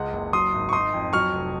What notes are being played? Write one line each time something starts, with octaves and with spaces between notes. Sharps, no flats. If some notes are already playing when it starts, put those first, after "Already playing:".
Already playing: C#2 G#3 F#5
F#1
F#3 C6 D#6
G#1
C#6
D#4 C6 D#6
F2
F#3 C#6 F6
F1